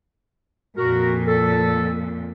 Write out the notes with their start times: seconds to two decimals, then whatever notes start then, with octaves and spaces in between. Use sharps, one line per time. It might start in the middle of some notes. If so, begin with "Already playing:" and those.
0.77 F2 A#2 F#4 A#4
1.28 A4